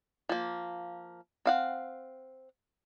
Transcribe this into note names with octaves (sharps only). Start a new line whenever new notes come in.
F3 A#3
C4 F5 F#5